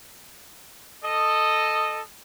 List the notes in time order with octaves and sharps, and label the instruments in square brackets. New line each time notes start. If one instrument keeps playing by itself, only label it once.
[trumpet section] A4 D#5